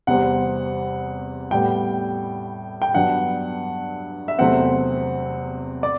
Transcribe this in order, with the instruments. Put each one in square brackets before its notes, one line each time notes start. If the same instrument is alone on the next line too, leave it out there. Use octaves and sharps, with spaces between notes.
[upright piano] E2 C3 G3 C4 F#5
A2 G3 B3 G5
G5
G2 F#3 B3 D4 F#5
E5
E2 C3 F#3 A3 C4 F#5
D5